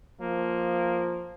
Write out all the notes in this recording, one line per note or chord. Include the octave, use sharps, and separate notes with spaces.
F3 A#3